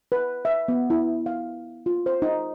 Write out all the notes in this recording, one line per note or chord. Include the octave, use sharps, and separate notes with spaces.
B4
E5
B3
E4
F5
F4
C5
D#4